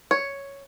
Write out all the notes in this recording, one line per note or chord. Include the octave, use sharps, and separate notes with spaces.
C#5